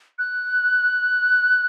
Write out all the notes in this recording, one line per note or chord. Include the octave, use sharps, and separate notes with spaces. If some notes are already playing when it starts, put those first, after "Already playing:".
F#6